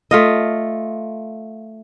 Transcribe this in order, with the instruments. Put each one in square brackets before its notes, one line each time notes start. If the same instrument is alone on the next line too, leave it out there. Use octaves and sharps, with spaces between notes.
[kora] A3 F4 D#5